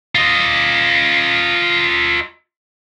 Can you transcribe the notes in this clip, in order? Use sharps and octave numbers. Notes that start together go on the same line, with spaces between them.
F4 D#5